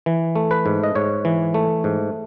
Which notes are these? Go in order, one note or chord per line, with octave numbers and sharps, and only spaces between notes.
E3
A3
B4
G#2
D#5
G#2 C#5
E3
A3
G#2